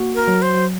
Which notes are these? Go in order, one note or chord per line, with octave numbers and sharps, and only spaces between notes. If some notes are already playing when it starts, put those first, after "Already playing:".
Already playing: A#3 F#4
A#4
F#3
C5